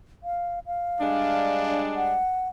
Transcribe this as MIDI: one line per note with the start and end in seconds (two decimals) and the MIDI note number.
0.23 0.59 77
0.66 1.81 77
1.01 2.17 55
1.01 2.17 56
1.01 2.17 62
1.96 2.49 78